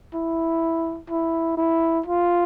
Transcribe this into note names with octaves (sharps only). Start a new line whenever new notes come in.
E4
E4
E4
F4